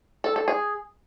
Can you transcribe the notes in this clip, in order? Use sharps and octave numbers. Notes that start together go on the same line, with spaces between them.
A4
A4
G#4